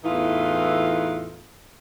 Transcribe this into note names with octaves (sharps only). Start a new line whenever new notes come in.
E2 A2 E3 D#4 F4 A4